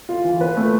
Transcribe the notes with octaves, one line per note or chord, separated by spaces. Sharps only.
F4
E3
B4
A3